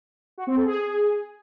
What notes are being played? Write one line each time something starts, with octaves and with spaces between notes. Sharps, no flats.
F#4
C4
A4
G#4